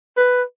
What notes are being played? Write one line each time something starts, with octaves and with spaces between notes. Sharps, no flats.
B4